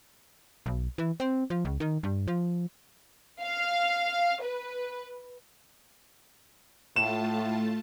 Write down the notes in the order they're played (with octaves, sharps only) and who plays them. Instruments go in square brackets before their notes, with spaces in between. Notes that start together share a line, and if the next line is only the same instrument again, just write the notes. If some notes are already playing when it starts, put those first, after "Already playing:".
[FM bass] B1
E3
C4
F3
C#2
D#3
G2
F3
[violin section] F5
B4
[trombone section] A2 [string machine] A3 F4 A5 [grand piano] E7